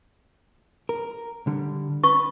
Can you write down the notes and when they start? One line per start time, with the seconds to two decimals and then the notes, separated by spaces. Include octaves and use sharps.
0.89 A#4
1.47 D3 G3
2.04 B4 C#6